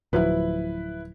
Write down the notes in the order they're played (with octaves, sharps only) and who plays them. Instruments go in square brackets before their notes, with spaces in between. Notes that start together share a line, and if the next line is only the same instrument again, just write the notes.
[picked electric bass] D1 F3 F#3 [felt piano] E4 B4